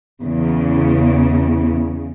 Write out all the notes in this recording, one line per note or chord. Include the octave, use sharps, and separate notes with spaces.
E2 C#3